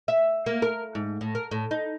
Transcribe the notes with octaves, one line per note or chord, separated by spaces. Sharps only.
E5
A#3
A#4
G#2
A2
A#4
A2
D#4